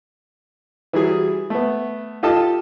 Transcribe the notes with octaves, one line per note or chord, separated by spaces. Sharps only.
E3 F#3 G3 G#4
A3 B3
F4 G4 A4 D#5 A5